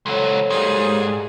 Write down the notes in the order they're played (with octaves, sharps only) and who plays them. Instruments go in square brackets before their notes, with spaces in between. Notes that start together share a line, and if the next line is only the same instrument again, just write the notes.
[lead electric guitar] C#2 F#3 [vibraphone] A4 C5 C#5
[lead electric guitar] G#2 [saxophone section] G3 A#3 G#4